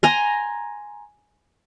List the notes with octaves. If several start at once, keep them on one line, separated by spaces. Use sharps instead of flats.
G#5 A#5 C6